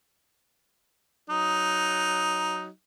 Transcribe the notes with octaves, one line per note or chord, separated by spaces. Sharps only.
F#3 D#4